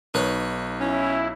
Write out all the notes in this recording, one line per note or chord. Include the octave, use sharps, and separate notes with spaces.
B1 D#4 B4 C#5
C#4 E4